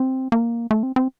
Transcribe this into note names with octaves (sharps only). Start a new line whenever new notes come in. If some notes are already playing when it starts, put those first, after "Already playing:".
Already playing: C4
A#3
A3
C4
C4